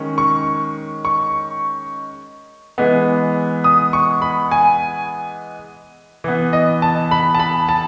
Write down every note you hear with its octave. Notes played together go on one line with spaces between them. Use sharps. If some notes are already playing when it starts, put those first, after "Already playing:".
Already playing: D#3 G#3 C#4
C#6
C#6
E3 G#3 B3
D#6
C#6
B5
G#5
E3 B3
D#5
A5
B5
A5
B5
A5